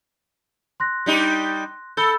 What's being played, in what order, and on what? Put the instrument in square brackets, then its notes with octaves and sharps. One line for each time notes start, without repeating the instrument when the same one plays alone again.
[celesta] C6 F#6 A#6
[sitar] G3 D#4 G4
[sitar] A4 [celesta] B5 E6 G6